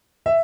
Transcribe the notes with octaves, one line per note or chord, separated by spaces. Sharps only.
E5